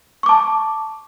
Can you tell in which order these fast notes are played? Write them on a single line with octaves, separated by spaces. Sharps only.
C#6 D6 A5